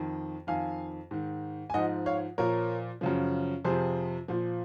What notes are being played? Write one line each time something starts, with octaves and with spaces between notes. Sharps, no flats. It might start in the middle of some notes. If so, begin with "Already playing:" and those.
Already playing: F2 D#3
F2 D#3 F5 G#5
G#2 D#3
G#5
G#2 F3 D#5 F#5
C#5 F5
A#2 F3 A#4 C#5
F#2 C#3 F3
F2 C3 F3 G#4 C5
A#2 F3